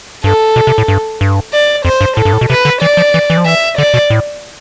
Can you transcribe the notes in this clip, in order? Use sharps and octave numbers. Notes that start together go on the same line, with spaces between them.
G2 A4
B2
C3
A2
G2
G2
D5
F2 C5
G2
A2 A4
G2
A2
B2
C3 B4
D3
E3 D5
F3
E3
E3
F3
E3 E5
D3 D5
B2
A2